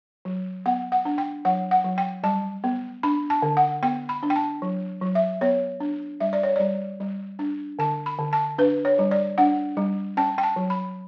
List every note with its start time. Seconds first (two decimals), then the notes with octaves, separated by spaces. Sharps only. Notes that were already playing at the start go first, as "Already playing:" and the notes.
0.25 F#3
0.66 B3 F#5
0.92 F#5
1.05 D4
1.18 G5
1.45 F#3 F#5
1.71 F#5
1.85 F#3
1.98 G5
2.23 G3 A5
2.64 B3
3.03 D4 B5
3.30 A5
3.42 D3
3.57 F#5
3.83 B3 G5
4.09 B5
4.23 D4
4.30 G5
4.36 A5
4.62 F#3
5.02 F#3
5.15 E5
5.41 B3 C#5
5.80 D4
6.20 G3 E5
6.33 D5
6.43 C#5
6.56 G3 D5
7.00 G3
7.39 D4
7.79 D3 A5
8.06 B5
8.19 D3
8.33 A5
8.58 D4 B4
8.85 C#5
8.99 G3
9.11 D5
9.38 D4 F#5
9.77 G3
10.17 C#4 A5
10.38 G5
10.43 A5
10.56 F#3
10.70 B5